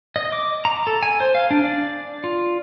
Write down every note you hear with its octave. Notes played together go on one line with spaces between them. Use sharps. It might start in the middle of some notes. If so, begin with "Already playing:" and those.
D#5
D6
A#5
A4
G#5
C5
F5
D4
D5
F4